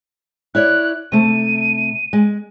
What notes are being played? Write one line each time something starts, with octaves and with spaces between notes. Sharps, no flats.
E4 C#5 D5 F#6
C3 A3 D#7
G#3